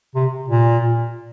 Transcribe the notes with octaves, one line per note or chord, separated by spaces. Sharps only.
C3
A#2